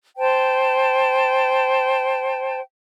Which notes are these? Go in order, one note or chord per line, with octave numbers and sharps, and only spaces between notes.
C5 G5 A5